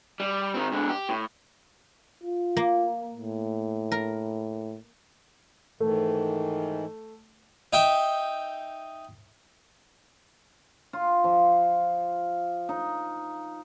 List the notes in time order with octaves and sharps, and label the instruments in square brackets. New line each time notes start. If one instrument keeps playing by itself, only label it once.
[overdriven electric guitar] G3
D#3 C4
G#2 D3
G4
A2
[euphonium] F4
[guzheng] A#3
[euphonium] A2
[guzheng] A#4
[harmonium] G#2 D#3 E3 [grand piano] A3
[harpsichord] D#4 E5 G5
[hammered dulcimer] F4
F3
D#4